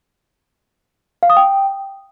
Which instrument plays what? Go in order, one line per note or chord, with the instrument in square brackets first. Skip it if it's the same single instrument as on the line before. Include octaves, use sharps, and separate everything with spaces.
[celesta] F5
D#6
G5